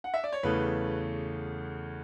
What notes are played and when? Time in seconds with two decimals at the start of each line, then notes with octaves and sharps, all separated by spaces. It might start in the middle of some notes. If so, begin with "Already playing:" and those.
0.04 F#5
0.14 E5
0.24 D5
0.33 C#5
0.43 E2 C#3 E3 A3 B4